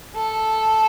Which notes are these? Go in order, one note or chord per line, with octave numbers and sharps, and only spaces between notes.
A4